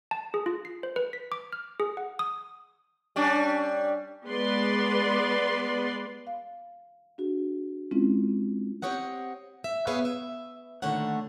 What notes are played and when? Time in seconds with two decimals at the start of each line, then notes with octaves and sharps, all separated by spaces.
0.11 A5
0.34 G#4
0.46 F4
0.65 C7
0.83 C5
0.96 B4
1.13 B6
1.32 D6
1.53 F6
1.80 G#4
1.97 F#5
2.19 D#6
3.16 G3 C#4 D4
4.25 G#3 B3 B4 D5 C6
6.27 F5
7.18 D4 F#4 G#4
7.91 G#3 C4 C#4 E4 F4
8.82 C4 G4 C#5 D#5 F#5
9.64 E5
9.87 B3 G#4 B4 C#5 E5 F5
10.05 E5
10.82 A#2 D3 D#3 A3 C#5 F#5